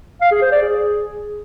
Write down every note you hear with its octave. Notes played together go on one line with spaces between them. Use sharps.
F5
G#4
C5
D5
G#4